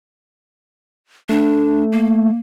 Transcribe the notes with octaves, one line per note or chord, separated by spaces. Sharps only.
A3 D4
A#3